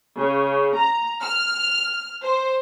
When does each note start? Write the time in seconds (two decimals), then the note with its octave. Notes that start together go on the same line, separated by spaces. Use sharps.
0.17 C#3
0.77 A#5
1.22 F6
2.23 C5